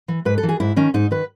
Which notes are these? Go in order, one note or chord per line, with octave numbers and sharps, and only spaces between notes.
E3
G#2 B4
A4
E3
G#4
G#2 E4
D#3 C#4
G#2 D#4
D#3 B4